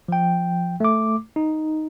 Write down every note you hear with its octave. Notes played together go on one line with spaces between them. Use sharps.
F3 G5
A3 D6
D#4